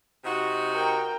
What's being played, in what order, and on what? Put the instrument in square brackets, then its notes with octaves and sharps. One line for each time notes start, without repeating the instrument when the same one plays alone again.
[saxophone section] C3 D#4 F#4
[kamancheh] A#4 G5